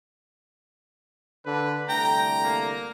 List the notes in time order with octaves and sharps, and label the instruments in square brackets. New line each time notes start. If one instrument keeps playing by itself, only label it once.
[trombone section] D3 [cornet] B4
[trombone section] C2 D3 A3 [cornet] G5 [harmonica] A#5
[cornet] A#3